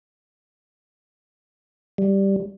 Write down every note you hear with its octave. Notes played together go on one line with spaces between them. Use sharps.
G3